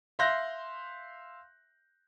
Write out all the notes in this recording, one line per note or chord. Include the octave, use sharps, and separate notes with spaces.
E5 F5 C6 F#6 G6 A#6